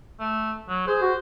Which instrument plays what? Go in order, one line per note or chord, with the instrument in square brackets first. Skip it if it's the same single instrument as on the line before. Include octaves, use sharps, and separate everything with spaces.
[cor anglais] A3
F#3
[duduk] G#4 [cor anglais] C5
[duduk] F#4